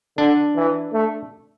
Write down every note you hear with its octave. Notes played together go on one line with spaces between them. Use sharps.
D3 D4
E3
A3